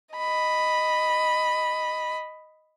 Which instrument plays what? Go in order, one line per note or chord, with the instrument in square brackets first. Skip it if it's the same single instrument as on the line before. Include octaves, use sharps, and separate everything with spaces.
[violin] D#5 B5